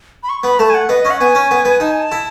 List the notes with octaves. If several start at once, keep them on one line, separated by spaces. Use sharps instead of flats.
B5
C#6
B3 B5
A3 A5
G#5
F#5
B3 D#5
C#4 D#5
F#5
B3 G#5
C#4
B3
B3
D#4 A5
G#5
A5
E4